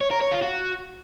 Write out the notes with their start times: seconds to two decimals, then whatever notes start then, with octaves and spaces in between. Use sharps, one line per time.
0.01 C#5
0.11 A#4
0.22 C#5
0.32 F4
0.43 F#4